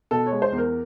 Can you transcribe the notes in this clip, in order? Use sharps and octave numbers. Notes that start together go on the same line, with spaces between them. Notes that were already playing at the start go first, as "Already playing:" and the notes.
B2 A4
C#5
G#3
C5
E2
A#4